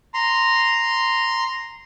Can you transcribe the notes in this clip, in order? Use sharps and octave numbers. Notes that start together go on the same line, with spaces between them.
A#5 C6